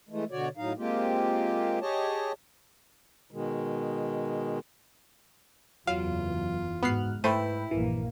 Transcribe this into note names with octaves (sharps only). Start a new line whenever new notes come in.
E3 G#3 A3
B2 D3 F#4 C#5 D5
A2 F#3 D#4 F5
G#3 A#3 C4 F4 G4
G4 G#4 C#5 D#5 A5
B2 D#3 G#3
F#1 E2 F#3 F4 F5
G#2 B3 F#4 F6 F#6 C7
G#2 A3 E4 B4 C5 G5 B5 D#7
A#1 G2 E3 A#3